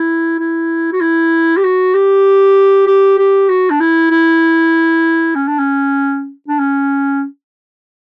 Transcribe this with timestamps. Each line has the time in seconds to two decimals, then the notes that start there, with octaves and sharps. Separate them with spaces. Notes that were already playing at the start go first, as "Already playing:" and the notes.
Already playing: E4
0.39 E4
0.93 F#4
1.01 E4
1.57 G4
1.64 F#4
1.94 G4
2.87 G4
3.18 G4
3.49 F#4
3.70 D4
3.80 E4
4.11 E4
5.35 C#4
5.48 D4
5.59 C#4
6.48 D4
6.59 C#4